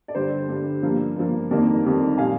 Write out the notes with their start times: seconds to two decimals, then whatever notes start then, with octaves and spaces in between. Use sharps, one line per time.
0.08 D5
0.15 G2 D3 G3 C5
0.49 G2 D3 G3
0.82 G2 F3 A#3
1.16 G2 F3 A#3
1.51 F2 D#3 G3 A#3 A#4 D5
1.84 F2 D#3 G3 A#3
2.18 A#2 G3 A#3 F5 G#5